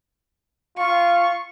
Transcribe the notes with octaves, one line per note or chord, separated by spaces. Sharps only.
F4 C#6